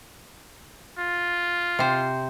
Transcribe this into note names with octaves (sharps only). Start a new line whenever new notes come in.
F4
C3 C5